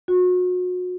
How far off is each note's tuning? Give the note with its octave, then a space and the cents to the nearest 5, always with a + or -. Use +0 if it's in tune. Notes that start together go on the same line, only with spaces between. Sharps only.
F#4 -35